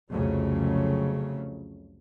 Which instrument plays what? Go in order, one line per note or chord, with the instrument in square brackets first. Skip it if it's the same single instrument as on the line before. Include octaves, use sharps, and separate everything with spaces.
[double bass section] C2 F2 C#3 F#3 A3